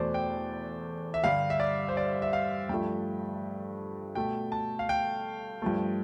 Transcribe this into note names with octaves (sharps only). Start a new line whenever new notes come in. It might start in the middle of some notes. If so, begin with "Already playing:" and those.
Already playing: E2 B2 A3 C5 D5
G5
E5
G2 D3 G3 F5
E5
D5
C5
D5
E5
F5
G2 F3 A3 G5
B2 A3 G5
A5
F5
G5
G2 F3 A3